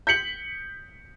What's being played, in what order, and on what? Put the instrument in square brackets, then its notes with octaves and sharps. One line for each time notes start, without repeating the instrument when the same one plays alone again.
[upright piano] G6 B6 C#7 F#7